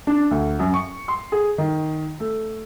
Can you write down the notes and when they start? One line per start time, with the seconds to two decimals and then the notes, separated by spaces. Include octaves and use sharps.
0.07 D4
0.31 D2
0.59 F#2
0.74 C#6
1.08 C6
1.32 G#4
1.58 D#3
2.20 A3